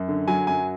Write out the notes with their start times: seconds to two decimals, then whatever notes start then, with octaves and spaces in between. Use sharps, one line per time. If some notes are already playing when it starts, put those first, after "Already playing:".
Already playing: F#2
0.08 D3
0.28 F#3 G#5
0.47 F#2 G#5